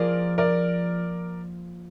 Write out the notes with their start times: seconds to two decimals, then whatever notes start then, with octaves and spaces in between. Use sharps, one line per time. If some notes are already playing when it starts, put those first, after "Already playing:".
Already playing: F3 A#3 F4 G#4 A#4 D5
0.38 A#4 D5